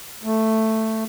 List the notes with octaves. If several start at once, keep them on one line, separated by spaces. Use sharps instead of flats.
A3